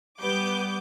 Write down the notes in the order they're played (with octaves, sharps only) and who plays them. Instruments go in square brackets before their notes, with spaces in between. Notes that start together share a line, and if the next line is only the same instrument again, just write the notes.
[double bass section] G3 [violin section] B3 D6 G6